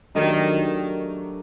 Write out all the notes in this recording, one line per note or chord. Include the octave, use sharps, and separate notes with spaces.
D#3 F#3 A3 D4 G4 A#4